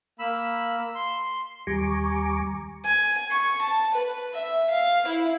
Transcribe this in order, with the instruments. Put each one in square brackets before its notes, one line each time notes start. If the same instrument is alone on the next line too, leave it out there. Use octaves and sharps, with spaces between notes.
[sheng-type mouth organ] A#3 B5 E6
C6
[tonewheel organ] D#2 G3 G#5 A#5 C#6 D6
[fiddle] G#5
C#6
A5
B4
E5
F5
E4